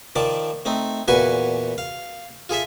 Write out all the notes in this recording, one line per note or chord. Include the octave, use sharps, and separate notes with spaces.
D#3 F3 D5 A5
A3 C4 D#4
E2 A#2 F#4 B4 G#5 C#6
F5
F4 G#4 A4 E5